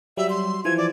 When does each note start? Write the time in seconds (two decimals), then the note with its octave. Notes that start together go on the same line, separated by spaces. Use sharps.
0.17 F#3 G3 E5
0.30 C6
0.65 E3 F3 G#6
0.78 D5